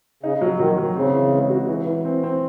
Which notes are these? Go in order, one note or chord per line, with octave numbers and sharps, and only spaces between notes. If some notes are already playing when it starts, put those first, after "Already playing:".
C#3 D#4
F#3
D#3 F#3
F#3
C#3 C4
E3
G#3
F#4
E3
E3
C4
C4